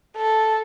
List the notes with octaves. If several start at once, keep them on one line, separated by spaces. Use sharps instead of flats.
A4